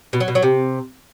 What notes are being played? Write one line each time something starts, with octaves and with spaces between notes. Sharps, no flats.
B2
F#3
B2
F#3
C3